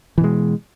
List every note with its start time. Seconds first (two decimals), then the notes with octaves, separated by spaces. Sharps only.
0.18 E3
0.21 B2
0.24 G#3